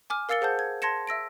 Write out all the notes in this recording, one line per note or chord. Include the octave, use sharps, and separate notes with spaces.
G#5 D6 F6
A#4 F5 E6 A6 C#7 G7
G#4 C5 F#5 A5 G6
G#6
A5 C6 G#6 A#6 C#7 E7
E5 E6 A#6 D7